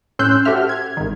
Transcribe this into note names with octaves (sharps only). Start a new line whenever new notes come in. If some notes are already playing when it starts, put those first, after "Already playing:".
A2 C#4 C6 E6 F#6 G6
F#4 G4 A4 C5 E5 F6
G#6
G#1 D#3